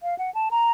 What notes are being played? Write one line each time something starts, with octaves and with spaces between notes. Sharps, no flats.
F5
F#5
A5
A#5